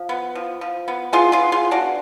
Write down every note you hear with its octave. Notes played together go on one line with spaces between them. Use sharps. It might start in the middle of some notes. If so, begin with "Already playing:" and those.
Already playing: F3
B3
F3
F3
B3
B3 F4 G#4
F4 G#4
B3
F4 G#4
B3
D4 F#4